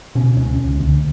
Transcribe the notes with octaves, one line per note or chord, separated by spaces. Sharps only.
B2 C#4
C#2 C#4
C#2
D2